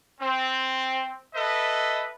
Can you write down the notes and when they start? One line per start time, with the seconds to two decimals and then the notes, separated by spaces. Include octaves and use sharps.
0.21 C4
1.35 A4 B4 D#5 E5